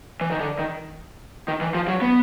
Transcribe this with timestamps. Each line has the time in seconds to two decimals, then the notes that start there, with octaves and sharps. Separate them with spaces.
0.21 E3
0.31 D#3
0.40 D3
0.59 D#3
1.48 D#3
1.61 E3
1.75 F3
1.88 F#3
2.02 B3